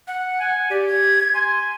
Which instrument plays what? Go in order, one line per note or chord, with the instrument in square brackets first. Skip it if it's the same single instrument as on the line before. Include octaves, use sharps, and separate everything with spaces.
[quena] F#5
[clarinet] G#5
[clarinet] G4 [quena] D5
[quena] G#6
[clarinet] G#5 [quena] C6